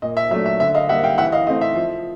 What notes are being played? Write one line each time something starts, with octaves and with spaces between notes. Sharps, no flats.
A#2 D#5
E5
F#3 A3 D4 E5
E5
D3 E5
D#5 F5
G3 A#3 E5 F#5
F5 G5
E3 E5 F#5
D#5 F5
A3 C4 D#5
E5
F3